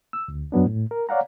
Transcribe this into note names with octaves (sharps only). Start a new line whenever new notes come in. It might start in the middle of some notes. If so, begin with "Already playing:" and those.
E6
D2
F#2 F#3 B3 D4
A2
A#4
C#5 D5 F5 F#5 A#5